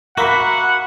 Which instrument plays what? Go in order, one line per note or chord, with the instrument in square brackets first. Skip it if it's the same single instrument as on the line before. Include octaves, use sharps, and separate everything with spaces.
[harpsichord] A#3 E5 [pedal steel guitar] F#4 B5 [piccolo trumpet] F#5